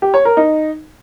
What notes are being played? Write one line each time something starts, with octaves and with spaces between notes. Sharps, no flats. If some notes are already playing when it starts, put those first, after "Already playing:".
G4
C#5
A#4
D#4